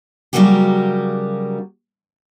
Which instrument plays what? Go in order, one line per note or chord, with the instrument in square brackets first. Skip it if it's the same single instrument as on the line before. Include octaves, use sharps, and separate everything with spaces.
[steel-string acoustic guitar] C#3 F#3 G3 A#3 F#4 G4